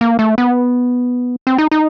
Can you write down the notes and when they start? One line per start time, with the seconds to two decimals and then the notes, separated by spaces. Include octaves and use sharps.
0.01 A#3
0.19 A3
0.38 B3
1.47 C4
1.58 D#4
1.71 D#4